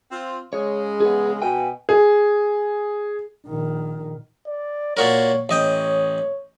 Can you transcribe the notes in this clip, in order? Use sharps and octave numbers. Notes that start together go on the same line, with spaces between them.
C4 F4
C#3 G#3 C#5
B3 G#4
B2 G5 G#5
G#4
A#1 D#3
D5
A#2 F#4 A#4 C#5
A1 C#5 D#5 G5